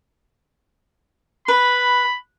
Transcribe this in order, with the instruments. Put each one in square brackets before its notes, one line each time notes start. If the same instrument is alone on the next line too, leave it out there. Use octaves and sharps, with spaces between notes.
[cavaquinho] B4 [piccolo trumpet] B5